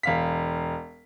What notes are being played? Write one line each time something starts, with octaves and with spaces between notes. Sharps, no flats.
E1 F5 B6